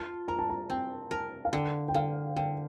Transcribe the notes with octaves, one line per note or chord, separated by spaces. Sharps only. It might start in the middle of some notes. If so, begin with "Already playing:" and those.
Already playing: F4 A5
A#4 A#5
A5
A#5
C4 G5
A#4 A5
F5
D3 G5
G5
D3 F5
D3 G5